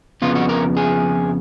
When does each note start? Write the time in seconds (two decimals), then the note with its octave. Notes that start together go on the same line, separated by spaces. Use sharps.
0.22 F2 C#3 F3 B3 F4
0.35 F#4
0.49 A#4
0.77 G#4